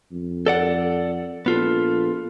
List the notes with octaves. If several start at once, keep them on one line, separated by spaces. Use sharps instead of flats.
F2
A4 D5 F#5
A#1 B3 F4 A4